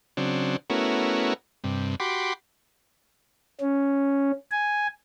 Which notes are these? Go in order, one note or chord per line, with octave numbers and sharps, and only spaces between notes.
C#3 F#3 C4 D4
A3 B3 C#4 E4 F#4 A#4
G2 C3
F#4 G4 B5 C6 D6
C#4
G#5